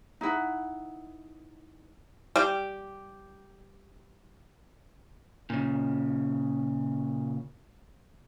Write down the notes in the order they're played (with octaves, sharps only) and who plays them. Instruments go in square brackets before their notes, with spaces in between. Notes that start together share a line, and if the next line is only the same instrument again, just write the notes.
[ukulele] D#4 E4 B4 F#5
[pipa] G3 G4
[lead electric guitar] A#2 C#3